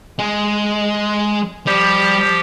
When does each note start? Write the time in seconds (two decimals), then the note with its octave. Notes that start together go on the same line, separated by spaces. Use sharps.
0.19 G#3
1.67 F3 G3 G4